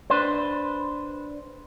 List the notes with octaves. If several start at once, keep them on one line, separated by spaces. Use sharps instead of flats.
D4 B4 C5